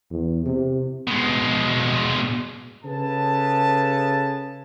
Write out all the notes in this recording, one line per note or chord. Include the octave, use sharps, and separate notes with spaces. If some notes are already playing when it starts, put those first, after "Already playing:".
E2
C3
B2 G#3
C#3 G#4 A4 B4 A5